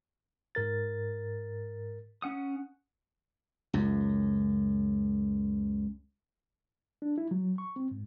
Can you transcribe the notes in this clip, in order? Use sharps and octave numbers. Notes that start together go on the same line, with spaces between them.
G#2 A#4 A6
C#4 F#5 D#6
C#2 F#2
D4
E4
F#3
C#6
C4
G#2